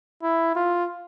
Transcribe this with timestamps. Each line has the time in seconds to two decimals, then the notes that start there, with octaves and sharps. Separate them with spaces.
0.23 E4
0.55 F4